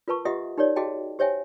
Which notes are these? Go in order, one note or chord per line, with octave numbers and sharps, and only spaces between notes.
F4 A#4 B4 A5 C#6
F4 G4 D#5 E5 F#5 D#6
D#4 G4 A#4 C#5 D5
F#4 G#4 D#5 F5 G5 A5
G4 C5 C#5 E5 G5 G#5